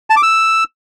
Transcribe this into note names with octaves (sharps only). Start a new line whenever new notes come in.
A5
D6
E6